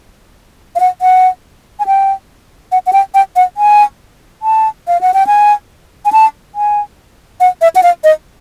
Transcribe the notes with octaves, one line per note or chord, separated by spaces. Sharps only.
F5
F#5
F#5
G#5
G5
F#5
F#5
G5
G5
F#5
G#5
A5
F5
F#5
G5
G#5
G#5
A5
G#5
F#5
E5
F#5
F5
D#5